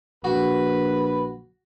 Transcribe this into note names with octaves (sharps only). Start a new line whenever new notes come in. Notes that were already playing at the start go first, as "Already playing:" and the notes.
A#1 F#4 B4